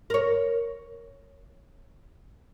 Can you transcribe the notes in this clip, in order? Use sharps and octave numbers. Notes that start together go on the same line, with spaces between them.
A#4 C#5